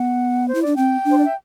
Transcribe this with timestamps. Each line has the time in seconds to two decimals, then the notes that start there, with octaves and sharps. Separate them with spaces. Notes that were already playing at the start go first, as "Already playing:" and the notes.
Already playing: B3 F#5
0.49 C5
0.55 E4
0.63 D4 D5
0.76 C4 G5
1.05 D4
1.12 C5
1.18 D5
1.25 E5